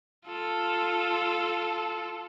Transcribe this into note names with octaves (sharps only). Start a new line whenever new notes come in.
F4 A4